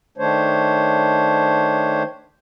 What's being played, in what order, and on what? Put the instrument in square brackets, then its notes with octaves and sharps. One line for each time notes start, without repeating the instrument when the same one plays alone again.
[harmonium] D#3 A3 D4 C5 C#5